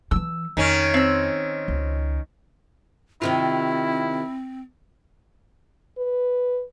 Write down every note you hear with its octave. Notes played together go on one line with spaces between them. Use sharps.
D#3 E3 E6
F2 D#3 C#4
C4 E6
C#2
C3 D#3 C4 E4 F4
B4